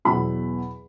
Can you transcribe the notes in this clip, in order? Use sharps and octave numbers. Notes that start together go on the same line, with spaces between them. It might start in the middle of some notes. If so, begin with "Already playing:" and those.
E2 B2 F#3 E4 B5